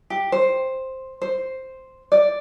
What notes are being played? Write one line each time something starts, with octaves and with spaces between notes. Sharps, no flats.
G4
C5
C5
D5